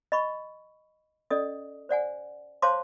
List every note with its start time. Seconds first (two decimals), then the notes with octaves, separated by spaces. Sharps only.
0.12 D#5 B5 C#6
1.30 C#4 A4 D5 D#5 D#6
1.89 C5 D5 F#5 G#5
2.62 C5 C#5 F5 A5 C6 D6